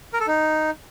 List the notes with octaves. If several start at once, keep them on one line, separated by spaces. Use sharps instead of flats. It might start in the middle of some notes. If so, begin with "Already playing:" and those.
A#4
A4
D#4